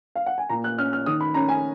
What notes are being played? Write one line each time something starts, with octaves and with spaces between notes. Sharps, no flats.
F5
F#5
G#5
A#2 A#5
F#6
C#4 F6
F6
D#3 D#6
B5
C#4 A#5
G#5